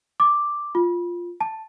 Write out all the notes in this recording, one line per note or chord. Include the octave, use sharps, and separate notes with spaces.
D6
F4
A5